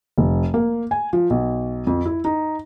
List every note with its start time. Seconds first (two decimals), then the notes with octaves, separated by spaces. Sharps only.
0.18 F1
0.54 A#3
0.91 G#5
1.13 F3
1.30 B1
1.87 F2
2.06 E4
2.25 D#4